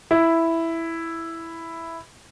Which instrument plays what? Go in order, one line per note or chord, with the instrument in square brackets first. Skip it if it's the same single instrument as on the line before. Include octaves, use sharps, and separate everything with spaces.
[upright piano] E4